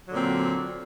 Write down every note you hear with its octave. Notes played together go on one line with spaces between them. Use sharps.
A#2 D3 F#3 C4